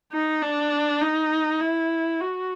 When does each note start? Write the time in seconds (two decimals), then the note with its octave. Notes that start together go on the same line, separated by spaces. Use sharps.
0.12 D#4
0.42 D4
1.01 D#4
1.61 E4
2.20 F#4